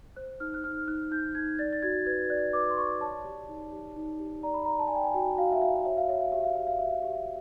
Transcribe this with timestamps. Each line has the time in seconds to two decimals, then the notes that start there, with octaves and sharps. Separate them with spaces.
0.16 C5 F#6
0.40 D#4 F6
0.54 F#6
0.64 D#4 F6
0.88 D#4 F#6
1.11 D#4 G6
1.35 D#4 G#6
1.59 D5 A6
1.73 A6
1.82 F#4 G#6
2.06 B4 G#6
2.30 D5 F#6
2.53 B4 D6
2.70 C6
2.77 D5 C#6
3.01 C#5 A5
3.25 G4
3.48 D#4
3.72 G4
3.96 D#4
4.20 G4
4.43 D5 A#5
4.54 B5
4.65 D5 A#5
4.79 A5
4.87 G#5
4.91 D5 G5
5.04 G#5
5.14 F#4 G5
5.38 F#4 F5
5.52 E5
5.62 F#4 F5
5.85 C#5 E5
5.97 F5
6.09 C#5 E5
6.21 F5
6.32 G4 E5
6.44 F5
6.55 G4 E5
6.67 F5
6.79 G4 E5
6.90 F5
7.02 G4 E5